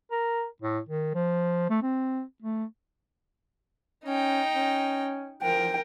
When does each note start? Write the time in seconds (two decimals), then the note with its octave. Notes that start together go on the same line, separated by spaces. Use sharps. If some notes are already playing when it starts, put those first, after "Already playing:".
0.11 A#4
0.62 A2
0.89 D#3
1.14 F3
1.70 A3
1.82 C4
2.42 A3
4.05 C#4 D#4 G5
4.55 C#4
5.43 F3 A#4 G5